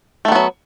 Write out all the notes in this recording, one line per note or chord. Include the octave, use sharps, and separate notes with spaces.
D#3 F#3 A3 B3